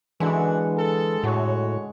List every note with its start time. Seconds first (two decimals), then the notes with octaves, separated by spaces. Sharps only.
0.20 F#2 D3 E3 G#3 D4 F#4
0.76 A4
1.23 A2 F#4 C#5